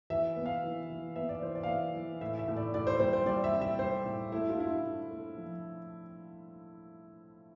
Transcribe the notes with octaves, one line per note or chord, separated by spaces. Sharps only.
E3 E5
B3
F5
E3
E3
B3 E5
D5
E3 C5
D5
F5
E3 E5
E3
A2 E5
E5
A2
D5
A2 D5
C5
G3 C5
C5
G3 D5
E5
C4
E5
G3 C5
A2
A3 E4
F4
D3 E4
F4
D3
A3
F3